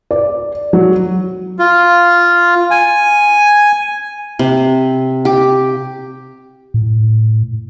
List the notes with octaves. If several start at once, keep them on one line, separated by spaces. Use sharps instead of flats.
D5
F#3
F4
G#5
C3
G4
A2